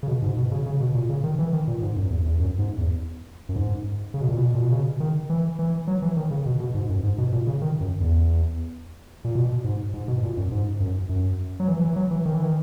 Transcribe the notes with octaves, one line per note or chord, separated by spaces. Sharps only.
C#3
B2
G#2
B2
C#3
C#3
B2
A#2
C#3
D#3
E3
D#3
A#2
G#2
F#2
E2
E2
F#2
G#2
E2
F#2
G#2
C#3
B2
A#2
B2
A#2
B2
C#3
D#3
E3
E3
F#3
E3
D#3
C#3
B2
B2
G#2
F#2
G#2
B2
A#2
C#3
D#3
F#2
E2
A#2
B2
G#2
G#2
B2
A#2
F#2
G#2
F#2
F#2
F#3
E3
E3
F#3
E3
D#3
E3
D#3